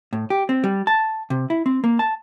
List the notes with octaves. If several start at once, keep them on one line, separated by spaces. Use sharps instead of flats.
A2
G4
C4
G3
A5
C3
E4
C4
A#3
A5